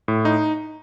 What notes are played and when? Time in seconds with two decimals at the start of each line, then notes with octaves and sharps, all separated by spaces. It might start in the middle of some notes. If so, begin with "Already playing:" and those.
0.08 A2
0.25 D#4